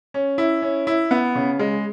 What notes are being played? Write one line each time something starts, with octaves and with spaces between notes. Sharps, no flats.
C#4
E4
C#4
E4
B3
C#3
G#3